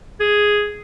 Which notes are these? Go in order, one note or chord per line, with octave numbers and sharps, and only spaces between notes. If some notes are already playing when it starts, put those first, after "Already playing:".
G#4